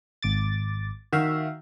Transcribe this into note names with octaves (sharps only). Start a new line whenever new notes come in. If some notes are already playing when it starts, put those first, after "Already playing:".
G#1 D6 A6
D#3 F#4 E5 F5